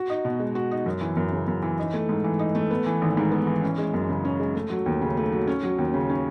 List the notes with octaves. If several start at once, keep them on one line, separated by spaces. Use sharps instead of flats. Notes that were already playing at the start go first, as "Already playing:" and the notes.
Already playing: F#4
D#4
B2
G#3
F#4
D#4
F#2
E3
F#2
C#3
F#2
E3
D#4
A3
G#2
E3
D#4
A3
B3
E3
G#1
G#2
B3
E3
C#4
G#3
F#2
C#3
C#4
G#3
A3
F#3
D#2
C#3
A3
F#3
C#4
F#3
D#2
C#3
C#4